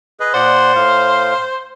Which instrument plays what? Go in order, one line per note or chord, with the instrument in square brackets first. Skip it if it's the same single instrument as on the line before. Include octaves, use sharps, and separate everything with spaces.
[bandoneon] G#4 B4 D#5
[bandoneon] A#2 D5 F#5 [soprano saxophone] C5
[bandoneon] A2 F5